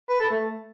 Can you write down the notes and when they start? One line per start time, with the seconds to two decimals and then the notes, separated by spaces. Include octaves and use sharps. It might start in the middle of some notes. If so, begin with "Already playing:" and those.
0.09 B4
0.20 A4
0.31 A3